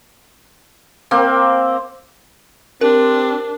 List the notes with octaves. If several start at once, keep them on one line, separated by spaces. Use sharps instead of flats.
A#3 C4
C4 D4 G4 A#4